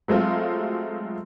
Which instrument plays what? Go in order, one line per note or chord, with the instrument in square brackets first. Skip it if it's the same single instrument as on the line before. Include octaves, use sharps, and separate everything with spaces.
[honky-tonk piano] F#3 G#3 A3 C4 F4